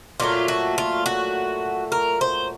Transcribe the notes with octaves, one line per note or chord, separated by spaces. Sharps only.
A#2 F#3 A3 F4
F#4
F4
F#4
A#4
C5